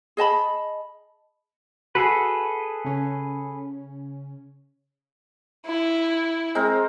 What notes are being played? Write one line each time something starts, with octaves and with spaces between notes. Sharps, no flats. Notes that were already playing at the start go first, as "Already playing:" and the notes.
G#4 D#5 A5 B5
F#4 G#4 A4 B4
C#3 C#4
E4
G#3 C4 A#4